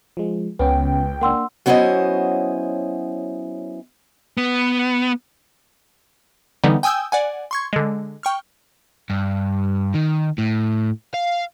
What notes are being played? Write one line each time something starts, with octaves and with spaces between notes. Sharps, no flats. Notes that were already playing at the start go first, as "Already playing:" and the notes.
F3 G#3
C#2 B3 C#4 B4 G5
A#3 D4 F#5 C6 E6
F#3 B3 C#4 E4 C5 D#5
B3
D3 E3 G3 B3 D#4
G5 G#5 D#6 E6 G6
D5 F#5 G#5
C6 C#6 G#6
D3 G#3
G5 C#6 F6
G2
D#3
A2
F5